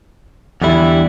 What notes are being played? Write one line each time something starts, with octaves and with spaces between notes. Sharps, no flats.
E2 D3 G3 E4